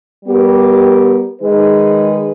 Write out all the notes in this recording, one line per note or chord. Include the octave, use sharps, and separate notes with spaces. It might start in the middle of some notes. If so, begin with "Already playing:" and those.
G3 B3 G4 A#4
D#3 G#3 D#4 G#4 B4